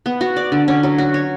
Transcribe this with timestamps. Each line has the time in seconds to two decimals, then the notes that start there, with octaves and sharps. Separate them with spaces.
0.06 B3
0.21 F#4
0.36 D5
0.52 D3
0.68 C#4
0.83 F#3
0.98 F#4
1.14 C#5